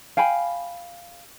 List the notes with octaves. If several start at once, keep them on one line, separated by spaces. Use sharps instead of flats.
F5 G5 G#5 B5